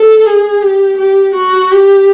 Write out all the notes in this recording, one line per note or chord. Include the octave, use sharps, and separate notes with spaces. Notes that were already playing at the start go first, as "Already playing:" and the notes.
Already playing: A4
G#4
G4
G4
F#4
G4